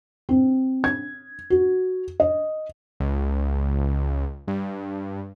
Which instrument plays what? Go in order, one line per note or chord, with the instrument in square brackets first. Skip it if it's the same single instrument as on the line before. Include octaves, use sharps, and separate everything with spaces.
[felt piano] C4
G#6
F#4
D#5
[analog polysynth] C#2
G2